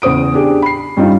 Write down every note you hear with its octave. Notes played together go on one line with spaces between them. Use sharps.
E2 C#3 C5 D#6 D7
D4 G4 G#4
B5 C7
G2 G3 C#4 D#4 F4